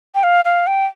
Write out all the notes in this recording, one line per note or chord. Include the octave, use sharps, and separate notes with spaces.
G5
F5
F5
G5